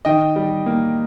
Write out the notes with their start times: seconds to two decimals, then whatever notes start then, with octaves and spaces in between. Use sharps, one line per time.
0.05 D#3 D#5 G5
0.36 G3
0.66 A#3